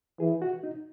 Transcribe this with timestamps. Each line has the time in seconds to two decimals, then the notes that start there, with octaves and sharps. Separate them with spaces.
0.20 E3 G#4
0.42 F#4
0.64 D#4